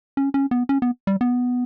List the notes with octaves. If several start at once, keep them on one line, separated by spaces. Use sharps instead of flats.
C#4
C#4
B3
C#4
B3
G3
B3